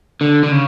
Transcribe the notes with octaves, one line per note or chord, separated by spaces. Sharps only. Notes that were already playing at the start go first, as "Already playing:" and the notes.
D3
D3
C#3